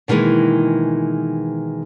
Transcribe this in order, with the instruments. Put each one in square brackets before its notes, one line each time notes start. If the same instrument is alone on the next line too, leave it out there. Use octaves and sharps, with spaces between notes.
[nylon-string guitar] B2 D#3 E3 G#3 A#3